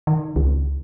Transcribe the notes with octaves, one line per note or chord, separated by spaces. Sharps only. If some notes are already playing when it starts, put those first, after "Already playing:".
D#3
C#2